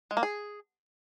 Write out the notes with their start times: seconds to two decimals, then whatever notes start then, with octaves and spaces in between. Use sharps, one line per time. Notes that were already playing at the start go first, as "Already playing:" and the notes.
0.11 G#3
0.17 A#3
0.23 G#4